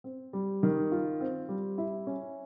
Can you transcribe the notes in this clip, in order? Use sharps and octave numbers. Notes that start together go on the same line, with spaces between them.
C4
G3
D#3
F4
C4
G3
E4
C#4